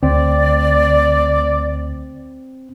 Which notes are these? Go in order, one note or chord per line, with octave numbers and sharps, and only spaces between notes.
D2 C4 D5